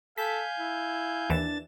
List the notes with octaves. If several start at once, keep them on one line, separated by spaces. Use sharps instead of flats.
A4 F5 G#5 G6 B6
E4
D#2 E3 D4 A6 E7